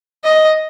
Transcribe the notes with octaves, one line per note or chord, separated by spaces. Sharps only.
D#5